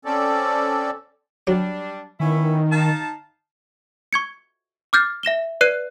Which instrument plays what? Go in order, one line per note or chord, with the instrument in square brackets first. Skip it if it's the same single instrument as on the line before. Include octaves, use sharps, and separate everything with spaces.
[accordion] C4 C#4 A4 D5
[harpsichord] F#3 [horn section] G3 D4
[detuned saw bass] D#3 [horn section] B3 C#4 E4
[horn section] D#4 F5 A5
[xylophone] C#6 G#6 C#7
D6 F6 G6 A6 C7
E5 A#6 E7 G7
B4 D5 F#6 C7 D#7